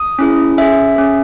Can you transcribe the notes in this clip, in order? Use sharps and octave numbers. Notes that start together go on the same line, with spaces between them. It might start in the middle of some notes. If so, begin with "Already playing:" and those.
Already playing: D#6
C#4 E4 G#4
C#4 G#4 E5
C#4 G#4